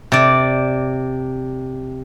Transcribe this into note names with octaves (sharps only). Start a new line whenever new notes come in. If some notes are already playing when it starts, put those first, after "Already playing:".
C3 D5